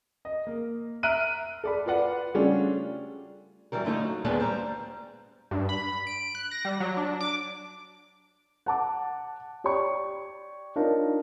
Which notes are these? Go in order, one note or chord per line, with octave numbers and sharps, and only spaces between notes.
D#5
A#3
E5 A#5 F6 F#6 D7 D#7
A4 D5 B5
F4 B4 D5 F#5
C#3 G3 A3 C#4 D4 F4
E3 F#3 G3 A#4
D3 A3 D#4 F4
F#3
D#2 A#2 G#3 A#3 B3 D4
G3 C5 A#5
G2
B5
D7
F#6
A#6
G3
F#3
D4
D6
F#5 A5 D6
G4 C#5 D5 G5 C#6
D4 D#4 F4 A#4 C#5